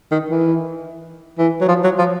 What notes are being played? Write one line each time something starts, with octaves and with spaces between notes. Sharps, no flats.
D#3
E3
E3
F#3
F3
F#3
F3